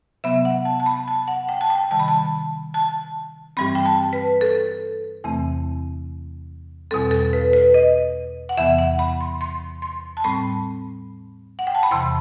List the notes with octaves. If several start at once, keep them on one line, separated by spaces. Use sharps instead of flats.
C3 F#3 B3 E5
F#5
A5
A5
B5
A5
F#5
G5
A5
G5
C3 D#3 G3 A5
B5
A5
A5
G2 E3 G3 C4 B5
G5
A5
B4
A4
E2 C3 E3 A3 C4
E2 B2 G3 C4 A4
A4
B4
B4
D#5
F#5
E2 C3 E3 B3 E5
F#5
B5
C6
C6
C6
A5
A2 G3 C4 B5
F#5
G5
A5
B5
E2 C3 E3 C6